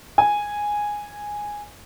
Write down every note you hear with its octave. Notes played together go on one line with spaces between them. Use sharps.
G#5